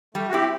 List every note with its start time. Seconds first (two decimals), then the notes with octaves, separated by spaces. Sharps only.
0.15 G3 A3
0.28 F#4
0.32 C4 E4 G4